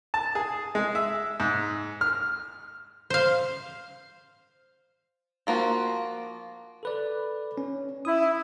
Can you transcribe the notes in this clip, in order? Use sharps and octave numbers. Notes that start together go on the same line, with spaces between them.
A5
G#4
G#3
E5
G#2
F6
C5 F5
F3 A#3 F4 F#4
A4 B4 D5
C#4
E4 D#6